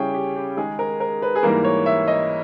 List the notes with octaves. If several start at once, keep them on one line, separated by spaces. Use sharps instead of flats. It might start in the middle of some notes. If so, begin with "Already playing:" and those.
Already playing: C#3 G3 C#4 E4 G#4 G5
G4
G4
D#3 G#3 D#4 G#4
A#4
A#4
B4
G#4
G#2 E3 G3 A#3 A#4
C#5
E5
D#5